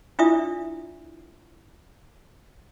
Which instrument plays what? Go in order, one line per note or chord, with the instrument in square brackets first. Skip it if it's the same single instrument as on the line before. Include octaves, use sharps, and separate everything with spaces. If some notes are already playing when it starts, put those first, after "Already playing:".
[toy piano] D4 E4 F4 D5 E5 D#6